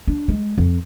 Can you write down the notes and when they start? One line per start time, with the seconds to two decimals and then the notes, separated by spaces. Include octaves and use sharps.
0.07 D4
0.28 G#3
0.58 F2